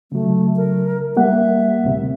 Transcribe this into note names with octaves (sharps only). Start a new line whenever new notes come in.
C#3 F#3 A3
A#4
G3 A#3 E5 F#5
D2 A2 C3